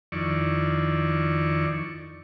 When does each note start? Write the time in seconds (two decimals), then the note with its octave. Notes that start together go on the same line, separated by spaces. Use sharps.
0.12 F2 D#3 E4 D5 C#6